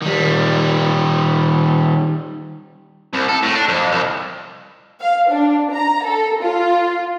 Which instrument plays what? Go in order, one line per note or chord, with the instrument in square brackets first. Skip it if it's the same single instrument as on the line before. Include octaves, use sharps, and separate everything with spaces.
[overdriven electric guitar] D#3 G3
[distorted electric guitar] C2
A4
A2
D4
F2
C2
[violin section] F5
D4
A#5
A4
F4